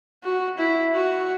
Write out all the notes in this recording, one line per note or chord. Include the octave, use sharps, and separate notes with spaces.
F#4
E4
F#4